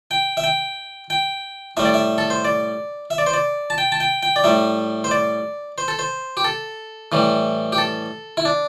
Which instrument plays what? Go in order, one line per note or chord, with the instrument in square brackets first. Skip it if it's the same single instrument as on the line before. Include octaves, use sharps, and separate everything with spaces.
[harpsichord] G5
E5
G5
G5
A2 G3 E5
D5
E5
A4
C5
D5
E5
D5
C5
D5
A5
G5
A5
G5
G5
D5
A2 G3 E5
C5
D5
C5
A4
C5
G4
A4
A2 E3 G3
G4
A4
E4
D4